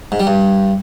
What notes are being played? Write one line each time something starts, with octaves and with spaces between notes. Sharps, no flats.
G#2
G3
G2